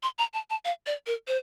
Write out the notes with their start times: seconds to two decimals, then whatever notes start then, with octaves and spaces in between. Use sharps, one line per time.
0.03 C6
0.18 A#5
0.34 A5
0.50 A5
0.65 F5
0.87 D5
1.07 A#4
1.28 C5